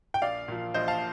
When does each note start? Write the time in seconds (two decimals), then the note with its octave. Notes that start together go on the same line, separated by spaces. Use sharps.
0.14 G5
0.22 A#1 D5 F5
0.48 A#2 F3
0.74 A#1 C5 D#5
0.88 F5 A5